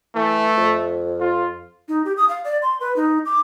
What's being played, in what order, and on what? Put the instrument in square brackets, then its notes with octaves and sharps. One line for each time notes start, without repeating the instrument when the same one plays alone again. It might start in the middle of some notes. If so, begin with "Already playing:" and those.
[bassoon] E3 [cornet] A3
[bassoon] F2
[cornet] F4
[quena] D#4
G4
D#6
F5
D5
C6
B4
D#4
D6